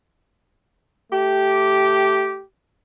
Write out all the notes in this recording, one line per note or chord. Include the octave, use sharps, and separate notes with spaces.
A3 G4